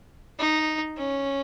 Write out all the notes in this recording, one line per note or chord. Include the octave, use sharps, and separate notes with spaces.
D#4
C#4